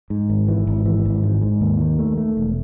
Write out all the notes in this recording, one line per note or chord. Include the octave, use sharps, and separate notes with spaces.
G#2
G#1
E3
G#1
E3
G#1
G#2
G#2
D#2
D#3
A3
A3
E1